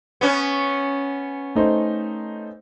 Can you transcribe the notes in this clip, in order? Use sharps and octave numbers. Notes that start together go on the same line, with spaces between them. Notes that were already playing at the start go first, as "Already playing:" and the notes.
B3 C#4
A3 D#4 C5